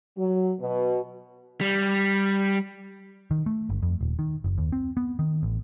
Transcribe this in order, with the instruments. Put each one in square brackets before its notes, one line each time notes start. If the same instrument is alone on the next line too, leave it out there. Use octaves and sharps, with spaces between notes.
[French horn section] F#3
B2
[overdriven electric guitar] G3
[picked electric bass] D#3
A3
G1
F2
D#1
D#3
F#1
D#2
C4
B3
D#3
A1